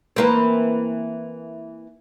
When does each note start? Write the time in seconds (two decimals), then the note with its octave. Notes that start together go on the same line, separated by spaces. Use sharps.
0.16 E3 A#3 C4